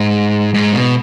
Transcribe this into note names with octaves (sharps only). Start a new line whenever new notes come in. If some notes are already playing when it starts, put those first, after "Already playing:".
Already playing: G#2
G#2
B2